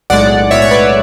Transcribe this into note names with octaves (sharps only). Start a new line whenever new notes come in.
B1 A2 G#3 D5 F#5
B1 A2 G#3 C#5 E5
C#5
B4 D5